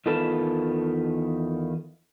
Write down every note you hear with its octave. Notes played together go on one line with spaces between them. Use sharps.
E2 D#3 F4 A4 B4 A5